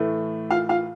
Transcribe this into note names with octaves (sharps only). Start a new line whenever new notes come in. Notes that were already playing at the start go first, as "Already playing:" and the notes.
Already playing: A2 E3 A3
F4 F5
F4 F5